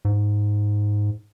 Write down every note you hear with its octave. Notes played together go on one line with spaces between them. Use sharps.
G#2